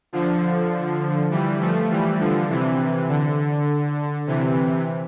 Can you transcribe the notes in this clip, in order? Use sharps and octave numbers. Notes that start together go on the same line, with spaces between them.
D3 F3
E3 G3
F3 A3
E3 G3
D3 F3
C3 E3
D3
C3 E3